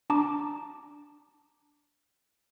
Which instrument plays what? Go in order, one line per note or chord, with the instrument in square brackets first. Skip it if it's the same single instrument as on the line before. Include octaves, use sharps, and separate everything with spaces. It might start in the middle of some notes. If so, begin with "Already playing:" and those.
[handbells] D4 A5 A#5 D6